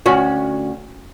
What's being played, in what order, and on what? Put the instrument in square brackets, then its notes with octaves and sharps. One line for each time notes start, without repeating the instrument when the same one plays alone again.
[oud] D2 C#4 F#4